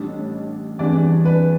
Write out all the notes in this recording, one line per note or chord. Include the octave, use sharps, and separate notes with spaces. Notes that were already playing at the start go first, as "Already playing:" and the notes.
Already playing: A1 A2 G3 D4
E2 E3 G3 D4 D5
B4